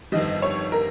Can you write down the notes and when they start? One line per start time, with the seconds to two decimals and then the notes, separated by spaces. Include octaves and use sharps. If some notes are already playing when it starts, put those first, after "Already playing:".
0.12 G1 F2 D#3 G3 D#5
0.42 C#5
0.72 A#4